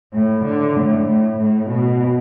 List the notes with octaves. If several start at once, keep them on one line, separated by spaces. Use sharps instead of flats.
A2
D3
A2
A2
A2
B2